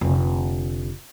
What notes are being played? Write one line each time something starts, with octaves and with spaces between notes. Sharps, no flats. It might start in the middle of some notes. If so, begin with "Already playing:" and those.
F1 D3